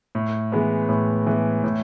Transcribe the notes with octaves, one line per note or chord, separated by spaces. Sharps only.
A2
E3 G#3 B3
A2
E3 G#3 B3
A2